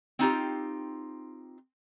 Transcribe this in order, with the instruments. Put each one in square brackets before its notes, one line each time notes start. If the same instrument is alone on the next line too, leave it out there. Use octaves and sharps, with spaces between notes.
[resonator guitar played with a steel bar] C4 D#4 F4 G4